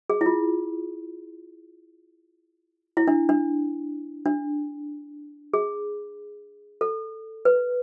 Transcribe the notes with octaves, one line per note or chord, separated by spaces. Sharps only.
G#4
E4
F4
E4
D4
D4
D4
G#4
A4
B4